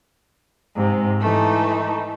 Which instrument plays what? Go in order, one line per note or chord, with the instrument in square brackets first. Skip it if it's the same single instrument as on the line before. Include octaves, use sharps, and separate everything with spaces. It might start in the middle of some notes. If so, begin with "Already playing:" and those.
[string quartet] G#2 C3
E3 A3 D#4